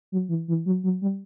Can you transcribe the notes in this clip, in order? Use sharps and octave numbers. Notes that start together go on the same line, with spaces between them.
F#3
E3
E3
F#3
F#3
G3